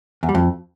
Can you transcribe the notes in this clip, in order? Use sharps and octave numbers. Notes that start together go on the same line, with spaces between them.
E2
G3
F2